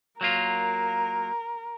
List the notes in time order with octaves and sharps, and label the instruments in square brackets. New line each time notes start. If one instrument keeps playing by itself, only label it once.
[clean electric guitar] F#3 A#3 F4 [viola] A#4